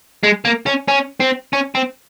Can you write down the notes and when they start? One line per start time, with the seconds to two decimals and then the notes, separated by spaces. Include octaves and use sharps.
0.23 G#3
0.45 A#3
0.66 C#4
0.88 C#4
1.20 C4
1.53 C#4
1.75 C4